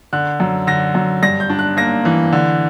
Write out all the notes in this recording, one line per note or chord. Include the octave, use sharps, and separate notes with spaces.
D3 F#6
F#2
D3 A#6
F#2
G2 A#6
G6
D4
F#6
A#3 A#6
E3
D3